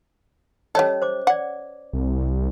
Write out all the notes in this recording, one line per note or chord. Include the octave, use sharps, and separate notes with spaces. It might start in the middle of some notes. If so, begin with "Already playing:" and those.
G3 C#4 A4 C#5 D#5
C5 D6
D5 F#5 D6
C2